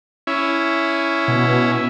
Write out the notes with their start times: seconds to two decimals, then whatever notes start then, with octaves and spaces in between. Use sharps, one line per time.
0.27 C#4 E4
1.28 B2